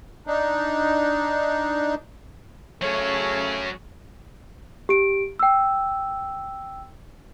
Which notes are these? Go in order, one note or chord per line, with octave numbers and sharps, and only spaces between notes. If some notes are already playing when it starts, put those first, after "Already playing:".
D4 D#4
C#3 F#3 A3 C#4 C#5
G4 D7
G5 E6